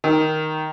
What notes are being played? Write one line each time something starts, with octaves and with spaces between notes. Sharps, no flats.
D#3